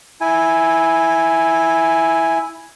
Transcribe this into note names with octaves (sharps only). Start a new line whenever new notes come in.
E4 G#5